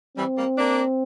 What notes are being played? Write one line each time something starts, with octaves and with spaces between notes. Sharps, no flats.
E3 G3 C4
G3 A#3
A#3 D4